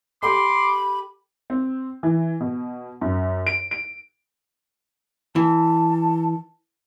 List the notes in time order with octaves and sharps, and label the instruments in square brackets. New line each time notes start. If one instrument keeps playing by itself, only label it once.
[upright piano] G4 A4 [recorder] B5 [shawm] C6 [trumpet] D6
[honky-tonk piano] C4
E3
B2
F#2
D7
D7
[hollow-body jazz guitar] E3 [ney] A5